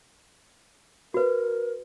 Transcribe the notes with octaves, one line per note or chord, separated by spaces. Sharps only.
F#4 A#4 B4